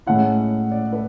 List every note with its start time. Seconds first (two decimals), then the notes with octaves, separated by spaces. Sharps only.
0.06 A2 G#3 C#4 E4 F#5
0.72 D5
0.93 B4